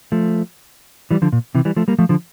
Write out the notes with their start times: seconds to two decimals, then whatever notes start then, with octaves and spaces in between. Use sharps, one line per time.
0.12 F3 A3
1.11 E3 G3
1.22 D3 F3
1.32 A#2
1.55 C3 E3
1.65 E3 G3
1.77 F3 A3
1.88 G3 A#3
1.99 F3 A3
2.09 D3 F3